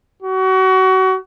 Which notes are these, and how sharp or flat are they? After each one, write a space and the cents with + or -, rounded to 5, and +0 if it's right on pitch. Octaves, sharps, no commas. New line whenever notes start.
F#4 +30